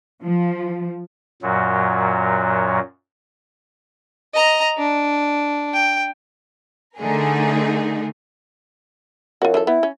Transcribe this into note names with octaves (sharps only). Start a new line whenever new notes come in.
F3
F#2 A#2 F#3
D#5 A#5
D4
G5
D3 A3 D#4 G#4 A#4
F#2 F4 F#4
E3 F3 A4
B3 E4
C#4